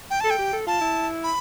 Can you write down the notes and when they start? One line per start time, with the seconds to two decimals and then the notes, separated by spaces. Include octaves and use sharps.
0.10 G5
0.21 A4 A5
0.30 G5
0.39 G4
0.53 A4
0.67 F4 A5
0.81 E4
1.24 B5